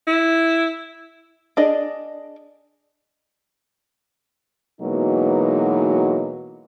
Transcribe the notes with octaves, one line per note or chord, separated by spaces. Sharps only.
E4
D4 G#4 D5 D#5
B2 E3 F#3 G#3 A#3 D#4